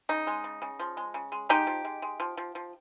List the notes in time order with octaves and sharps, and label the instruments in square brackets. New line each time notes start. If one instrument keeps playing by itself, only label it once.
[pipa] C#3 D#4
G#3
C#3
C#3
F3
G#3
C#3
G#3
G#3 D#4 G4
F3
G#3
G#3
F3
F3
F3